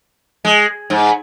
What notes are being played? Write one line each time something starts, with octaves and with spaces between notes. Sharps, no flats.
G#3
G#2